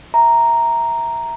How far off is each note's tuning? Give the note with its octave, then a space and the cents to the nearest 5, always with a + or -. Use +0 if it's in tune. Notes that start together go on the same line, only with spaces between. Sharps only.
E5 +0 A#5 +0